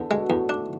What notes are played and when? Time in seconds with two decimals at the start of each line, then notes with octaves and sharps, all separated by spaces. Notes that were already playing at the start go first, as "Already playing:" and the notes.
Already playing: E2 D3
0.10 B2 G#3
0.30 E2 A2
0.49 G#2 D4